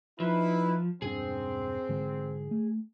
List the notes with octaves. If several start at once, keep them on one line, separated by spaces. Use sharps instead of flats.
F3 D#4 E4 B4
E1 G2 C4 D4 G#4
G#2 D3 G#3
A3